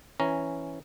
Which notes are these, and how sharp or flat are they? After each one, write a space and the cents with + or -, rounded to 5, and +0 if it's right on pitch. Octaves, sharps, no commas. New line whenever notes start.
E3 +0 C#4 +0 A#5 +0